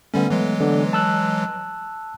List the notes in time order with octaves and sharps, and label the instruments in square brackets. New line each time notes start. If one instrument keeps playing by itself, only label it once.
[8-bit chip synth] D3 G3 C#4 [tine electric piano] A3 B3
[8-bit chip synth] E3 F#3 G#3
[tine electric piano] D3 B3 D5
A5 E6 F#6